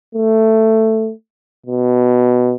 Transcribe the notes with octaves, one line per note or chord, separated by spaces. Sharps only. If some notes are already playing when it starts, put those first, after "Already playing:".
A3
B2